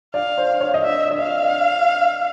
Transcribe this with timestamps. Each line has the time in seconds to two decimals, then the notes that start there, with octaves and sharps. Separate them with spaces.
0.14 D5 F5
0.38 C5
0.61 C#5
0.74 D#5
0.84 D5 E5
1.11 D5
1.18 D#5 F5